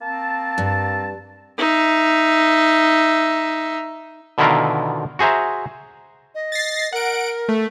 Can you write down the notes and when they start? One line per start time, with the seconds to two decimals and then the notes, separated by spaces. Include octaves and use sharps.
0.01 A#3 C4 A5
0.58 G2
1.58 D#4 E5
4.38 B2 D3 D#3 E4 F4 A#4
5.19 F#4 G#4 C5 E5 A#5
6.35 D#5
6.52 A6 A#6 C7
6.93 A#4 F#5 D7
7.49 A3